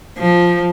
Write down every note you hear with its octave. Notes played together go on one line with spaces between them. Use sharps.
F3